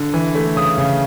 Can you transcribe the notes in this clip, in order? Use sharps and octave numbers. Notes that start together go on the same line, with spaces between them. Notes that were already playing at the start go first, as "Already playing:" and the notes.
Already playing: D3
E3
A3
C#3 D#6
C#3